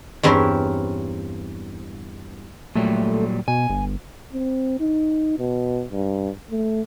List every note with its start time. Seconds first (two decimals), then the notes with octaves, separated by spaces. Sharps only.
0.23 E2 G2 C4 C#4 A#4 C5
2.75 A#2 F#3 G3 A3
3.48 B2 G#5
3.70 G1
4.33 C4
4.80 D#4
5.39 B2
5.91 G2
6.51 A3